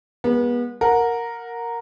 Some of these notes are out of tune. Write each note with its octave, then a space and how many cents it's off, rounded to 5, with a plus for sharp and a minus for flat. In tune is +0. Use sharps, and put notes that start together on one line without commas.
G#3 -35 B3 -30
A#4 +0 F#5 -20